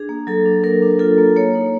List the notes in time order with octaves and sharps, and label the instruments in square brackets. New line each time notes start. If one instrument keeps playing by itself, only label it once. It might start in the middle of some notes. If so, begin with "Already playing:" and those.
Already playing: [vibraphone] D4 G#4
A#3
F#3 A4
D4
A#3 A#4
D4
F4 A4
A#3
A#3 C#5
D#4